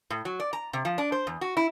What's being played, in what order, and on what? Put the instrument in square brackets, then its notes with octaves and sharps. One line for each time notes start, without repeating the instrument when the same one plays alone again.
[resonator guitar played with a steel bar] A2
F#3
D5
A#5
C3
F3
D4
C5
E2
F#4
E4